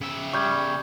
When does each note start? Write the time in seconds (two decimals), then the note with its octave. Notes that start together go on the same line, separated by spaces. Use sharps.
0.01 C#3 E5
0.33 G3 C#6 G6 G#6